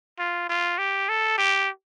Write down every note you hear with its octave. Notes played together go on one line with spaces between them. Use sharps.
F4
F4
G4
A4
G4